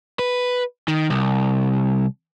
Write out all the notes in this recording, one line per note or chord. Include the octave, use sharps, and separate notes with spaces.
B4
D#3
C2